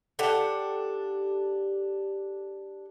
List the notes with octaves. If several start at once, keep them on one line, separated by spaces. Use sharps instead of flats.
D4 G4 A4 F#5